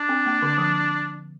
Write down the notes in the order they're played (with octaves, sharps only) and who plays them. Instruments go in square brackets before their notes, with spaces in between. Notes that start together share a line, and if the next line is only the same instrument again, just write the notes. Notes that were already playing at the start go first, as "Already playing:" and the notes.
Already playing: [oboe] D4
[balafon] C4
A#3
D3
F3